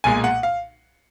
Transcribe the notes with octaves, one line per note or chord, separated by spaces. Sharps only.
B1 A#2 G#3 G#5
F#5
F5